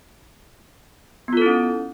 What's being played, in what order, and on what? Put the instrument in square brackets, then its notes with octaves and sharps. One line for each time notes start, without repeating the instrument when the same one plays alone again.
[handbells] B3
F4
A4
E4
C#4